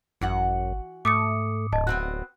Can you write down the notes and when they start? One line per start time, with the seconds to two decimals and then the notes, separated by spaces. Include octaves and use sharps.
0.21 G#1 F#2 E3 F#4 F#5
1.05 G#2 A3 D6 D#6 C#7
1.73 D1 D#5 A5
1.87 B3 C4 F#4 F#6